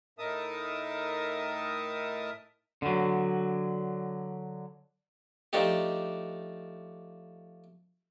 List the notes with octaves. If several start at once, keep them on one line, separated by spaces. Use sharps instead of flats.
A2 D#4 A#4 E5 A5 D#6
D3 F#3
F3 A3 D4 D#4 G4